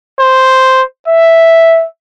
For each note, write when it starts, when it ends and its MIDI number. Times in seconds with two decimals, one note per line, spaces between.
0.20 0.83 72
1.08 1.85 76